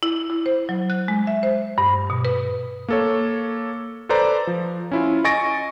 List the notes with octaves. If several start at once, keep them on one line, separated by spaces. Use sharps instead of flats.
E4
E4
C5
F#3
F#6
G#3
E5
C5
G2
B2
B4
A#3 A4 C#5
A4 B4 C5 D5 A#5
F3
C#4 E4 F4
D#5 G#5 C#6 A6 A#6 D7